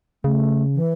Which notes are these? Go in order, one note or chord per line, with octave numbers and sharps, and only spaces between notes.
C#3 A3
E3